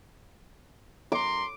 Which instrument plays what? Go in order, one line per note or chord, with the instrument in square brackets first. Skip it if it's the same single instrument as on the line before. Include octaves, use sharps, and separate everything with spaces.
[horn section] F#2 A#5 C6 [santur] D6